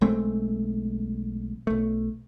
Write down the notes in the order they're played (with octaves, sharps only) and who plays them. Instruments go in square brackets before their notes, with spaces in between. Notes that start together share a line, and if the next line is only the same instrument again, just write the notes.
[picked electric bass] B1 G#3 A3 C4
B1 A3